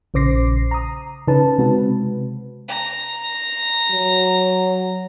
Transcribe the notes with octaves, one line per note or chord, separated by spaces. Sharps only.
A#1 C#3 C5 D6 A#6 C7
A#5 D#6
C#3 C#4 D#4 B4 A5
C3 G#3 C4 F#4 B4
A#5
F#3